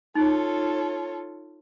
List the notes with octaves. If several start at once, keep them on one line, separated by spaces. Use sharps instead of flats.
D#4 F4 A4 C#5